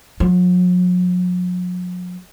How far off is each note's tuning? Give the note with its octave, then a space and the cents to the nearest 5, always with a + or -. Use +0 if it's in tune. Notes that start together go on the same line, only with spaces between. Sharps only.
F#3 -45